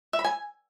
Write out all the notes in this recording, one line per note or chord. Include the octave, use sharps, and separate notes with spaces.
E5
B5
G#5